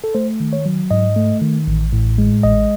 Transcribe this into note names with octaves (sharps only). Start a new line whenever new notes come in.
A4
A3 C5
D#3
C#5
F#3
G#2 D#5
A3
D#3
A1
A2
G#3
A1 D#5